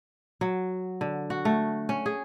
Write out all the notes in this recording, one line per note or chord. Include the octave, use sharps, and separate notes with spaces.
F#3
D3
F#4
A3
C#4
G#4